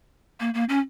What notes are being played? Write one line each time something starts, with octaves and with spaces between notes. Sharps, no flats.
A#3
A#3
C#4